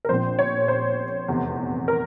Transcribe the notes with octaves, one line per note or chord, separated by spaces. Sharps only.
A#4
A#1 A#2 F3 C4 C5
C#5
C5
F1 E2 C3
A#4